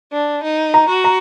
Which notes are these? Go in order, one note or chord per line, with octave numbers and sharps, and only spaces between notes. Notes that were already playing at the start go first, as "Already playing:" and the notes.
D4
D#4
A#5
F#4
A#5